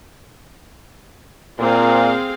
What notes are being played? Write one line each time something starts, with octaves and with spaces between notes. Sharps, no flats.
A#2 C4 G#4 F5